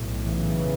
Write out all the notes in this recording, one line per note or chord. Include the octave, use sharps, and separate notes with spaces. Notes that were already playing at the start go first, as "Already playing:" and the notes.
Already playing: B1 A2
C#3 E3